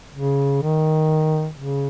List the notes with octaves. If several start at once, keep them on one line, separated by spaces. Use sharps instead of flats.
C#3
D#3
C#3